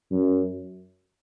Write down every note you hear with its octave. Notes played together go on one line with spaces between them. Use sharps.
F#2